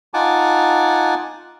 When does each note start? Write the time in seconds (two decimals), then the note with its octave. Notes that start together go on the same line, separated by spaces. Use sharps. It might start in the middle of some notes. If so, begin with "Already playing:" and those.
0.14 D#4 F4 F#5 G#5 A5 D6